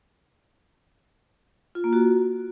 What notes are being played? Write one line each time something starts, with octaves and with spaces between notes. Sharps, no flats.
F4
A#3
F#4